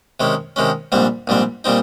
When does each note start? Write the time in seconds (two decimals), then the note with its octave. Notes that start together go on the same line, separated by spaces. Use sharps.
0.20 C3 D#3 G#3 C#4
0.56 C3 D#3 G#3 C#4
0.92 A#1 G#2 G3 C4
1.27 A#1 G#2 G3 C4
1.64 A#2 G3 C4 D#4